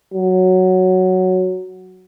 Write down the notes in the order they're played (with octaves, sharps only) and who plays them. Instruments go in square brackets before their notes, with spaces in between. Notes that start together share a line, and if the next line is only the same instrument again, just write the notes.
[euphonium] F#3